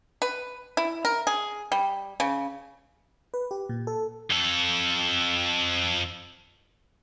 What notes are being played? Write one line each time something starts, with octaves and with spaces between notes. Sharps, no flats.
B4
E4
A#4
G#4
G3
C#3
B4
G4
A#2
A4
F2 A4